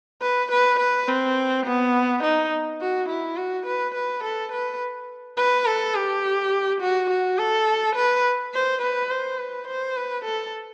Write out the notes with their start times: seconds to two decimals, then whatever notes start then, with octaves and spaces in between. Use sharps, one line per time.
0.22 B4
0.51 B4
0.79 B4
1.08 C4
1.66 B3
2.23 D#4
2.81 F#4
3.09 E4
3.37 F#4
3.66 B4
3.95 B4
4.24 A4
4.52 B4
5.37 B4
5.66 A4
5.95 G4
6.81 F#4
7.10 F#4
7.38 A4
7.96 B4
8.53 C5
8.82 B4
9.10 C5
9.38 B4
9.68 C5
9.96 B4
10.25 A4